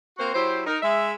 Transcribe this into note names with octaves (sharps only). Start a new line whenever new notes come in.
A#3 C4 F#4 C5
F#3 E4 G4 C5
D#4 A#4
G#3 E5